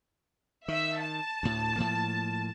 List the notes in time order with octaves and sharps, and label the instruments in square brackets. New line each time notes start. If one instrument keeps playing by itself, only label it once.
[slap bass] D#3 [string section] E5
[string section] A5
[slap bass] D2 A2
A2 F3 A#3